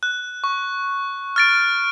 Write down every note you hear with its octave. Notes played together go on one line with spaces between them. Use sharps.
F#6
C#6
F6 A6 D7